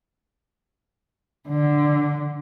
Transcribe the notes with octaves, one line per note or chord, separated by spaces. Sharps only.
D3